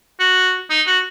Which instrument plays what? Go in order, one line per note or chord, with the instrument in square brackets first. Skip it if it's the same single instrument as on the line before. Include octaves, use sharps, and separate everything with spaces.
[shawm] F#4
D#4
F#4